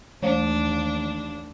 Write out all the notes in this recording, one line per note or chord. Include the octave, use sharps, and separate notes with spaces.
D#2 E3 A3 D4